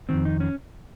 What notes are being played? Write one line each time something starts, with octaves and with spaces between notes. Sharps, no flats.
F2 D#3 C4
D#4
C#4